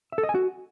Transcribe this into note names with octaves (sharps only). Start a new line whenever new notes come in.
E5
A4
D#5
G#5
F#4